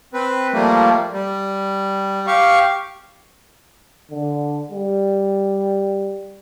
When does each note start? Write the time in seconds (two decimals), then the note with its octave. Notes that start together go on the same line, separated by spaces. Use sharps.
0.14 C4 B4
0.53 F3 G3 A3 A#3
1.13 G3
2.27 G4 F5 C#6
4.11 D3
4.71 G3